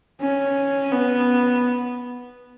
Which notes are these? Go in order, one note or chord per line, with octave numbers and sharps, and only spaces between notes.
C#4
B3